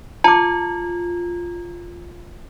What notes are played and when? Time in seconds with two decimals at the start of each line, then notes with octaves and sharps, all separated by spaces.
0.24 F4 A5 D6